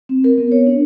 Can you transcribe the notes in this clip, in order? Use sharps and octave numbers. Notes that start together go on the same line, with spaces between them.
C4
A#4
B3
C#5
D4